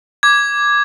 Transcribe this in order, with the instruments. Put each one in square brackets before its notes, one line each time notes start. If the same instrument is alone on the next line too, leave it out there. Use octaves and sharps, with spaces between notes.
[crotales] D6 G#6